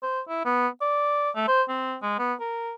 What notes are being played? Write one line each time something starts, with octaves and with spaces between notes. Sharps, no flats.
C5
E4
B3
D5
A3
C5
C4
G#3
B3
A#4